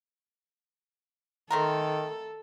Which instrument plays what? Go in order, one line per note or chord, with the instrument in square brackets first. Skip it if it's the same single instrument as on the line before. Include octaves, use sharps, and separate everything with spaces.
[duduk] D#3 [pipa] A3 C4 A#4 [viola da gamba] A4